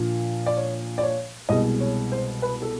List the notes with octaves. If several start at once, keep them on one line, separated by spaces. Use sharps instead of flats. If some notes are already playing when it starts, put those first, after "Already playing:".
Already playing: A#2 F3 A#3 D4 F4
D5
C#5
D5
C#5
C2 B2 G#3 D#5
C#5
C5
B4
A4